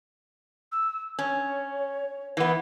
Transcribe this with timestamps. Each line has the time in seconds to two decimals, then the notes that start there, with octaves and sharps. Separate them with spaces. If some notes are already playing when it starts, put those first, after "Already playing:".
0.72 E6
1.19 C#4 C#5
2.37 E3 B3